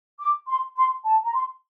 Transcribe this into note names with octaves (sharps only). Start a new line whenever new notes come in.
D6
C6
C6
A5
A#5
C6